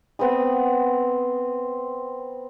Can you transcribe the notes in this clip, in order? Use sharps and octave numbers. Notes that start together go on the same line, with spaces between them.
B3 C4 B5 D#6